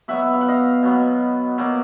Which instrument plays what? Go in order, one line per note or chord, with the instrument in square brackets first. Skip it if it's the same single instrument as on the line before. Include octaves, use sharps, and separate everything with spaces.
[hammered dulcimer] B2 F#3 B3 E5 F#5
F5
F#5
D#5 F5
B2 F#3 B3
B2 F#3 A#3